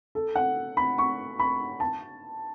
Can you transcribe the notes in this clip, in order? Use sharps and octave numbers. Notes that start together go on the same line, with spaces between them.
A4
F#5
B5
C#6
B5
A5